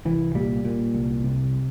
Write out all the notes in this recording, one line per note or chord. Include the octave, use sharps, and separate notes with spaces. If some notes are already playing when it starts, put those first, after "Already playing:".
C2 E3
A#2 G3
A#2
C2
C3